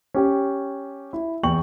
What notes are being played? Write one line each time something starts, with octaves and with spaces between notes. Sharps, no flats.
C#4 G4
E4
E2 G5 C#6 F#7